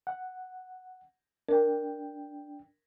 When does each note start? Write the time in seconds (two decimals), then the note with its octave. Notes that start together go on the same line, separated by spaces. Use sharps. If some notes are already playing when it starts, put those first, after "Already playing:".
0.07 F#5
1.49 D4 A#4 G5